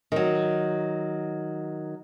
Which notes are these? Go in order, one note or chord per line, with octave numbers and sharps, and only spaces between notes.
D#3 F#3